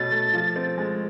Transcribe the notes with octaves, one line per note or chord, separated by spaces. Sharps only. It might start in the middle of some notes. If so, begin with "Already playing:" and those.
Already playing: B2 A3 C#4 A6
A3
F3
C4
G#3